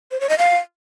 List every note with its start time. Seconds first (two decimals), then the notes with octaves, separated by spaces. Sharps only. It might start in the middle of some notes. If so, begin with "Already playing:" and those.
0.11 C5
0.20 C#5
0.29 D#5
0.38 F5